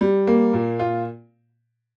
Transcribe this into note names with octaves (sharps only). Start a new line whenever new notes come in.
G3
A#3
A#2
F4